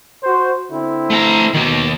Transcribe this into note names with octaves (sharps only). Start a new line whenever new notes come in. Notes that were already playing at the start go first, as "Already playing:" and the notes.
F#4 C5
D3 C4 E4
A3 A#5
B2 D#3 A#3